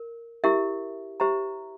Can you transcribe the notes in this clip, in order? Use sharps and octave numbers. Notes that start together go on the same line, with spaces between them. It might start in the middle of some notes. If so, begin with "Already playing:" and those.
Already playing: A#4
E4 G4 A#4 E5
G4 C5 E5 A#5